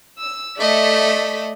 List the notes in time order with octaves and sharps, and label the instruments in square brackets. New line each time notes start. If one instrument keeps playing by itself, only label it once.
[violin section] E6
[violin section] A3 B6 [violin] D5 D#5